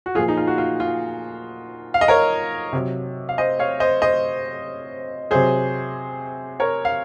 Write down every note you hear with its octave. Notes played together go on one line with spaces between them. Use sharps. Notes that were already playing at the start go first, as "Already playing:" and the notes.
F#4
A#2 F3 F4 G#4
D#4
F4
F#4
F4
F4
F5
D#5
A#4 C#5
C3 F#3
F5
C5 D#5
C#5 F5
C5 D#5
C5 D#5
C3 F#3 G#4 C5
A#4 C#5
F5